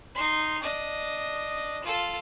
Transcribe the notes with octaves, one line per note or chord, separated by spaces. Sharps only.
D#4 C6
D4 D#5
F4 A4